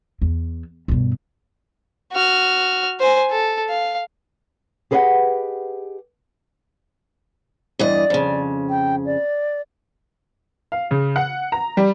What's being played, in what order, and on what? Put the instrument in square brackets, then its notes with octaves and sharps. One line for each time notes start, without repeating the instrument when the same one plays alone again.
[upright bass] E2
G2 B2
[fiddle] F#4 F6
C5 G#5
A4
F5
[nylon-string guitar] G4 G#4 B4 D#5 E5 F#5
[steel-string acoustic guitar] E2 G2 D#5 [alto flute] D5
[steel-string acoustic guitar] F2 C#3
[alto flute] G5
D5
[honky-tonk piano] F5
C#3
F#5
A#5
G3